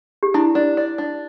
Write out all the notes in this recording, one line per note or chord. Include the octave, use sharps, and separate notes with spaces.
G4
D4 E4
D4
D5
D4